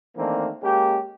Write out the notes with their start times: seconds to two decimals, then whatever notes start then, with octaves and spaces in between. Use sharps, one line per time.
0.17 D#3 E3 A3 A#3 C4 D4
0.62 G#3 A#3 C#4 G4